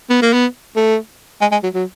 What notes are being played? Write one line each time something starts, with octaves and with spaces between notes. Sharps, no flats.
B3
A#3
B3
A3
G#3
G#3
F#3
F#3